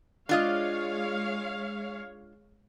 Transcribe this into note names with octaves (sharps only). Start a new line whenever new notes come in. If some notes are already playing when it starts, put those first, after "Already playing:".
G#3 D4 F4 C#5 D#5 F5